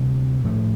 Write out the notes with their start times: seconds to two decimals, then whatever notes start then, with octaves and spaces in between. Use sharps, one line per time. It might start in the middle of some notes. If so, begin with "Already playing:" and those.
Already playing: D2 C3 G3
0.44 A2 F3 A3